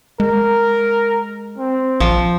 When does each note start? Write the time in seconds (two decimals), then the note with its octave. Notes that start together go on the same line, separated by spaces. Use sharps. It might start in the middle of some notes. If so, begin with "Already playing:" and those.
0.20 G#3 A#4
1.58 C4
2.00 A#1 F3